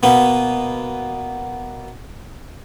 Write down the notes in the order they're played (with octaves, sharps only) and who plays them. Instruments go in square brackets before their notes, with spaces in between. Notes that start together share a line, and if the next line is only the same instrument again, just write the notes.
[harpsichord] B2 A#3 B3